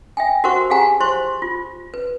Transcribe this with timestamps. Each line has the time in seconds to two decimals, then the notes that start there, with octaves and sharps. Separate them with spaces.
0.17 E5 G5 G#5
0.44 F#4 A#4 C5 F#5 C#6
0.70 G4 G#4 F5 F#5 G#5 A#5
1.00 E4 C5 C6 C#6
1.42 F4
1.94 B4